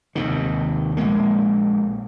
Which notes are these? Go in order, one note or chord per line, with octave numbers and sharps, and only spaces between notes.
D#2 C3 D#3
A#1 G#3 A#3